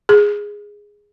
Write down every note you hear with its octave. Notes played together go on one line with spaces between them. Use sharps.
G#4